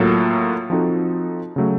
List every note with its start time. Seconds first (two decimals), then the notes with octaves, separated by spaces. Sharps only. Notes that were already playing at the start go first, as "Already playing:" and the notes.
Already playing: A2 F#3 A#3 F4 A4
0.70 F3 C4 D#4 F#4 A4
1.56 C#3 F#3 A3